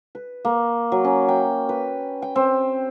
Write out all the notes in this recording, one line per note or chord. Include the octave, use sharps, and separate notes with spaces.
B4
A#3
F#3
C#4
G5
B4
G5
C4